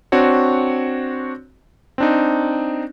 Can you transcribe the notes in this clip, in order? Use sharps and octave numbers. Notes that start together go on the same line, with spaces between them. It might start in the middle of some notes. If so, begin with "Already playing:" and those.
C4 D4 F#4 C#5
C4 D4 D#4